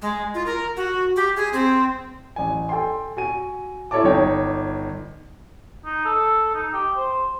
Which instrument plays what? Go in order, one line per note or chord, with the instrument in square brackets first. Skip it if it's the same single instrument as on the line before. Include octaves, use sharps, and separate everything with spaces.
[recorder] G#3
F4
A#4
F#4
G4
G#4
C4
[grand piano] A1 G#5
A4 G5 G#5 C6
F#4 G#5 D#7
E4 A4 C#5 D5 A5 D6
G1 D#4 C#5 G5
[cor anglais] D#4
A4
D#4
G4
C5